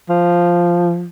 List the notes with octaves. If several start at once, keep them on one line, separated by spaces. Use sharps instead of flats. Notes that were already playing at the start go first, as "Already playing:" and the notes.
F3